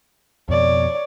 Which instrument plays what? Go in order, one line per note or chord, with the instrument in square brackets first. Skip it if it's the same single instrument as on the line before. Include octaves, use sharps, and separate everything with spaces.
[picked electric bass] F2 B2 [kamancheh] C#5 D5